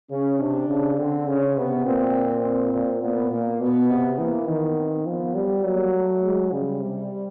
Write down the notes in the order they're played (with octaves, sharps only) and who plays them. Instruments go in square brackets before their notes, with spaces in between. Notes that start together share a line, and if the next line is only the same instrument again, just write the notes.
[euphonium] C#3 [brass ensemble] C#4
[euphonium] C3 [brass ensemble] D4
[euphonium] C#3
[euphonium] D3 [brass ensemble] C4
[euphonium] C#3 [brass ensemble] C#4
[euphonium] C3 [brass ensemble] B3
[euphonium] A#2 [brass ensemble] C4
[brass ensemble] C4
[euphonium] A#2
[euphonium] A#2 [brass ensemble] B3
[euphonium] A#2 [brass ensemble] A#3
[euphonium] B2 [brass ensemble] B3
[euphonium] C3
[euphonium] E3 [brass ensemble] A#3
[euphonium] D#3 [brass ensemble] B3
[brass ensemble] C4
[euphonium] F3 [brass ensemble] B3
[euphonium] G3
[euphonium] F#3 [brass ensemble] A#3
[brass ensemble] A3
G#3
[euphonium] C#3 [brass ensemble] G3
[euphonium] C3 [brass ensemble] G3